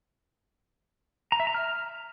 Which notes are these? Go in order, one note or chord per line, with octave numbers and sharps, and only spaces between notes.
A#5
E5
A#5
F6